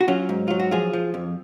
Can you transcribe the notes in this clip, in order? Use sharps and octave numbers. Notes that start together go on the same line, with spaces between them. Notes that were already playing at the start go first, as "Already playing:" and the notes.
F#4
F#3 C#4 F4
G#2
F#3 F4
F#4
F3 F4 G#4
F3
F2